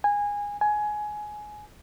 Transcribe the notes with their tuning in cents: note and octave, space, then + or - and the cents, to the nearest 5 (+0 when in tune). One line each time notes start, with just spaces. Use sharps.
G#5 -20
G#5 +15